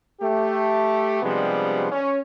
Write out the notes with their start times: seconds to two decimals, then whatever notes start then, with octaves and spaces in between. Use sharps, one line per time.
0.21 A3 G4
1.23 C3 F3 G3 G#3 B3 D4
1.91 C#4